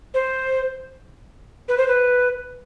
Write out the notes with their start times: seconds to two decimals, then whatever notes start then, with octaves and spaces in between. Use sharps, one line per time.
0.14 C5
1.68 B4
1.77 C5
1.88 B4